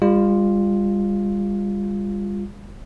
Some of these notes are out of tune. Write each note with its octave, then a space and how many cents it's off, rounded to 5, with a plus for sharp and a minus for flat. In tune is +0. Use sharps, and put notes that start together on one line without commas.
G3 +40 F4 +0